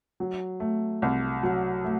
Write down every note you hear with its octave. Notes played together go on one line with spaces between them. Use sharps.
F#3
A3
C2
F#3
A3